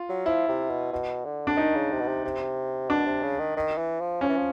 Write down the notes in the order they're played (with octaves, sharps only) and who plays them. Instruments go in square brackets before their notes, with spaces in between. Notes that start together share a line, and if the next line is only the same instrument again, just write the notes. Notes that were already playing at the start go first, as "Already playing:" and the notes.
Already playing: [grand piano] F4
[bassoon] F#3
[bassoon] F3 [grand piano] E4
[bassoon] C3
B2
B2
D3
[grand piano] D4
[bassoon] D#3 [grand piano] D#4
[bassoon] C#3
C3
B2
C3
C3
[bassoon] B2 [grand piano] D4
[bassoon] C3
C#3
D#3
D#3
E3
F3
[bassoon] F3 [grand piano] C#4
[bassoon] E3
F3